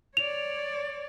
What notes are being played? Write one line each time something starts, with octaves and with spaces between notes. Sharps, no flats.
C#5 D5 F7